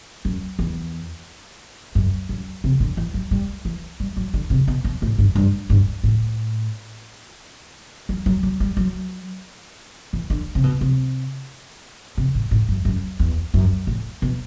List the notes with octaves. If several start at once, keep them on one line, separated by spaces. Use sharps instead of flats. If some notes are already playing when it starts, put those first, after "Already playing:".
F#2
E2
F#2
F#2
C3
D3
E3
F#3
G3
E3
G3
F#3
D3
C3
B2
B2
A2
G2
G2
G2
A2
F#3
F#3
F#3
G3
F#3
E3
D3
C3
B2
C3
C3
A2
A2
F#2
F#2
E2
F#2
A2
B2